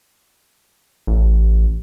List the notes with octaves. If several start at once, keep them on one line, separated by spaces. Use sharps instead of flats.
A1